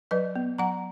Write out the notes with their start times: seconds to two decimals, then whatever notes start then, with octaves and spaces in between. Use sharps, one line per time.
0.11 F#3 B4 D#5
0.35 B3
0.58 F#3 F#5 A#5